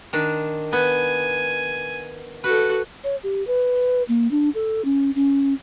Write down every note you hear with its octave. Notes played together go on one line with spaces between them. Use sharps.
D#3 D4
B3 G#5
F#4 A4 B4
C#5
G4
B4
A#3
D4
A4
C#4
C#4